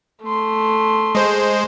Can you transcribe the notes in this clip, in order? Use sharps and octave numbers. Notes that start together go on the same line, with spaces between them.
A3 C6
G#3 C5